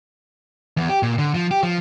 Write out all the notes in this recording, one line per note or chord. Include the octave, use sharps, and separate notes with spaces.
E2
G4
A#2
D3
F3
G4
F3